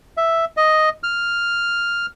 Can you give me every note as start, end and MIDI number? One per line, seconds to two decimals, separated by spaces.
0.17 0.45 76
0.57 0.89 75
1.03 2.06 89